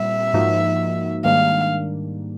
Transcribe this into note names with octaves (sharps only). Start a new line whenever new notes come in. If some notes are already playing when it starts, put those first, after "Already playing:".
Already playing: A#2 G3 C4 E5
G#2 F3 A#3 D#4 F#4
G#2 D#3 G3 A#3 D4 F5